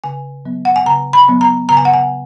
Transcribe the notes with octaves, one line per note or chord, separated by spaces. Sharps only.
C#3 G#5
F#3 B3
F#5
G#5
C#3 A#5
B5
F#3 B3
A#5
C#3 A#5
G#5
F#5
G#5